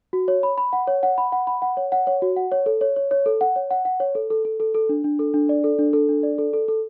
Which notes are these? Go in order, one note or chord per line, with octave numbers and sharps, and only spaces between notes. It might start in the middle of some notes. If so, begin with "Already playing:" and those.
F#4
C#5
B5
B5
F#5
C#5
F#5
B5
F#5
B5
F#5
C#5
F#5
C#5
F#4
F#5
C#5
A4
C#5
C#5
C#5
A4
F#5
C#5
F#5
F#5
C#5
A4
A4
A4
A4
A4
D4
D4
A4
D4
D5
A4
D4
A4
D4
D5
A4
A4
A4